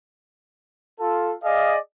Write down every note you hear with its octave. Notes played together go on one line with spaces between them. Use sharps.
F4 A4
G#4 D5 D#5 F5